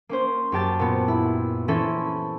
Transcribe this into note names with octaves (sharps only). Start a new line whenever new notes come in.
A#3 C#4 C5
F#2 G4 A5 A6
A#2 B3
E4
E3 C#4 E4 A4 C5